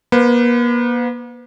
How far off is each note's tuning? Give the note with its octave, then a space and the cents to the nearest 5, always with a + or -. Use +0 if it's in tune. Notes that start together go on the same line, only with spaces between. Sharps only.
A#3 +45 B4 +35